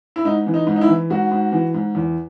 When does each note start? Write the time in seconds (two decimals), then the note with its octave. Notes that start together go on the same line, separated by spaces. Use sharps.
0.16 E4
0.25 G#2 D#4
0.47 E3
0.54 D#4
0.67 G#2
0.76 D#4
0.81 E4
0.88 E3
1.10 G#2 F#4
1.31 G#2
1.52 E3
1.74 G#2
1.95 E2